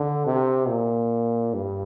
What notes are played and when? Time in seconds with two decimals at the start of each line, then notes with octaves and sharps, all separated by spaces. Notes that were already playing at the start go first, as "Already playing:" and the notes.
Already playing: D3
0.26 C3
0.68 A#2
1.54 G2